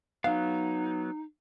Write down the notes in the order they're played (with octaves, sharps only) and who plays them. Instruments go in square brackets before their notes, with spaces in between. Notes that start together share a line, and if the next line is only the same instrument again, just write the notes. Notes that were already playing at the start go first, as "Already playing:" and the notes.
[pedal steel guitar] F#3 B3 [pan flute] D#4 [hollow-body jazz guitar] F5